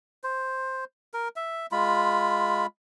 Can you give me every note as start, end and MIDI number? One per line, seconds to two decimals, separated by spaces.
0.24 0.85 72
1.14 1.28 70
1.36 1.66 76
1.72 2.66 56
1.72 2.66 65
1.72 2.66 83